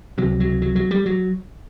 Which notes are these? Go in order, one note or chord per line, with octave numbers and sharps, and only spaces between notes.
C#2 C3 F#3
F#3
F#3
F#3
G3
F#3